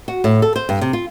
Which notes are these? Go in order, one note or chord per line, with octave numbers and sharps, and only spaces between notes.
F#4
A2
A4
C5
G2
C3
F4